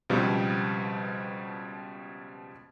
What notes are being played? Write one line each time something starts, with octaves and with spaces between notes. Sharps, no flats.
C#2 B2 F3 G3 B3 C4